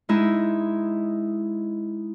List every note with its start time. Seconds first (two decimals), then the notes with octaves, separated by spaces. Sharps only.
0.09 G#3 D#4 E4